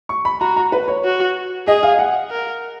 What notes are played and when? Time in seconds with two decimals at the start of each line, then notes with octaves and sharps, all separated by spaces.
0.09 C#6
0.25 B5
0.41 F#4 A#5
0.56 A#5
0.72 B4
0.88 C#5
1.05 F#4
1.68 G#4 D#5
1.83 F5
1.99 F#5
2.31 A#4